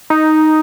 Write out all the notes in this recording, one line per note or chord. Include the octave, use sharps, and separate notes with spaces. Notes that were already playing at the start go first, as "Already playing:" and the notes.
D#4